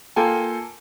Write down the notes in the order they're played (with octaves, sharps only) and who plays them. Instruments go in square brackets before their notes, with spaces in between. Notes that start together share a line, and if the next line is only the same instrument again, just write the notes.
[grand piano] A#3 F4 A4 G5 G#5